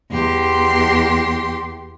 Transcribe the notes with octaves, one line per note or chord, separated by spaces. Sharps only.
E2 G4 C6